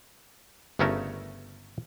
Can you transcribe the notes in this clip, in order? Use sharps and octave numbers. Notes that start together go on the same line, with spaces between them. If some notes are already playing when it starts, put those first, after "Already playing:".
G1 C#3 A3 C#4 A#4 A5